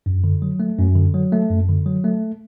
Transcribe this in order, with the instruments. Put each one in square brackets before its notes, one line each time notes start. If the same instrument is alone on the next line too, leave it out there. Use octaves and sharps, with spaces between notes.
[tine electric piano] F#2
D3
F#3
A3
F#2
D3
F#3
A3
F#2
D3
F#3
A3